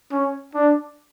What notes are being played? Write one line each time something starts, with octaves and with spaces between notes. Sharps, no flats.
C#4
D4